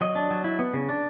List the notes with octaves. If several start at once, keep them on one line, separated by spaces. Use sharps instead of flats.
F#3 D#5
D4
F#3
E4
B3
C#3
D4